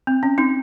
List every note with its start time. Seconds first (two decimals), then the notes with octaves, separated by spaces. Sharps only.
0.07 C4
0.23 C#4
0.38 C4 D#4